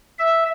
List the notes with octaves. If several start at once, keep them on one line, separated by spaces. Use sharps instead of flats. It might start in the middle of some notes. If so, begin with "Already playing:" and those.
E5